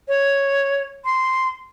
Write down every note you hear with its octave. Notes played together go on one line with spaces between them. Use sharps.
C#5
C6